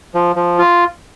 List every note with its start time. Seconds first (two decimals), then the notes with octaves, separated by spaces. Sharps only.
0.15 F3
0.36 F3
0.59 F4